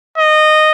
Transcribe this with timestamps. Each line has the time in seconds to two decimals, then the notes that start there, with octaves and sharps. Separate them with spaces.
0.18 D#5